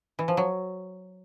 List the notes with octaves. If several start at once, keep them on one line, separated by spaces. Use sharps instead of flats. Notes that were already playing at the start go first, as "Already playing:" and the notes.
E3
F3
F#3